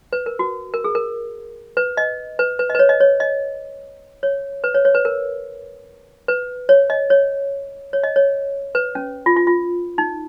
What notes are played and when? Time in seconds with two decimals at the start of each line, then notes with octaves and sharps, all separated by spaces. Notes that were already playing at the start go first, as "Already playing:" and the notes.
0.13 B4
0.26 A#4
0.39 F#4
0.74 A#4
0.84 G#4
0.95 A#4
1.77 B4
1.97 D#5
2.39 B4
2.59 B4
2.70 D#5
2.75 B4
2.79 C#5
2.89 D#5
3.00 C#5
3.20 D#5
4.23 C#5
4.64 B4
4.74 C#5
4.85 C#5
4.95 B4
5.05 A#4
6.28 B4
6.69 C#5
6.90 D#5
7.10 C#5
7.93 C#5
8.03 D#5
8.16 C#5
8.75 B4
8.95 C#4
9.26 F4
9.36 F4
9.47 F4
9.98 D#4